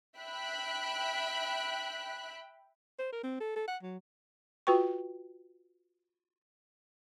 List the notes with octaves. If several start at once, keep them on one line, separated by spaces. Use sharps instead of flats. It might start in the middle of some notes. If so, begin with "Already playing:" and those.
E5 G5 B5 F#6 B6
C5
A#4
C4
A4
A4
F#5
F#3
F4 F#4 B4 G5 C#6